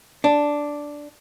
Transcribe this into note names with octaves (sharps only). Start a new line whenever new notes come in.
D4